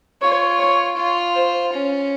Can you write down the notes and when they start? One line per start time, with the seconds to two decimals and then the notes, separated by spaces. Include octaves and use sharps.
0.22 F4 C#5
0.59 C#5
0.97 F4
1.35 C5
1.73 C#4